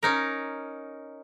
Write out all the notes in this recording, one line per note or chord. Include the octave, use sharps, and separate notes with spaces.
C#4 D#4 A#4